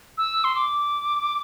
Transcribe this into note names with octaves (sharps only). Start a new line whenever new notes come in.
E6
C6
D6